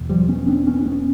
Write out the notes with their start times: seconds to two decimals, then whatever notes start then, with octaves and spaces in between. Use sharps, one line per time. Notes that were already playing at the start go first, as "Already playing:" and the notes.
Already playing: E2 B2
0.09 F3 G3
0.28 B3 C#4
0.47 C4 D4
0.67 B3 C#4
0.81 D4
0.86 B3 C#4